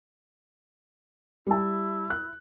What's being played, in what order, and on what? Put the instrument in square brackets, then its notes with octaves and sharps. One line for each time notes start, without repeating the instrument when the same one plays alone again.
[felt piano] G3 A5 [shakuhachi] E4
[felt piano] F#6